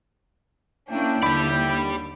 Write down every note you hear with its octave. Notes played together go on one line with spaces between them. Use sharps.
A#3 C#4 D4 E4 G5
D#2 D3 G4 D5 B5